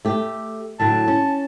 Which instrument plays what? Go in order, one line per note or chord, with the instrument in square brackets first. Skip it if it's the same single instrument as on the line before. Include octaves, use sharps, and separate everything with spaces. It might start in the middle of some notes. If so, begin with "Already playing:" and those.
[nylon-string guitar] A3 G4
[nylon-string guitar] A2 D3 F#3 [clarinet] A5
[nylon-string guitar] C#4